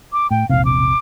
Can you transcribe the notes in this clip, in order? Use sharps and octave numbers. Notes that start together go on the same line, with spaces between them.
D6
A2 G5
E1 A#1 C3 F5
D6